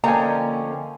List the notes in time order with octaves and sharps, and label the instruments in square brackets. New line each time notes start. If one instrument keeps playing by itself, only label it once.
[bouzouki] D3 F3 C#4 [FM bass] A#3 [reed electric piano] D#5 G5 G#5 [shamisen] A#5